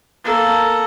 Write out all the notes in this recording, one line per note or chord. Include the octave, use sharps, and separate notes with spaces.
A#3 A4